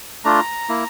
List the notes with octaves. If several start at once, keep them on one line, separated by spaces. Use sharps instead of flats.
A3 D4 F4 A#5
A#3 E4